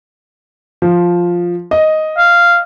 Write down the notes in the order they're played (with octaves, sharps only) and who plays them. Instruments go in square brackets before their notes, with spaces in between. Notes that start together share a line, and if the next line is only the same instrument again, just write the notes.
[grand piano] F3
D#5
[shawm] F5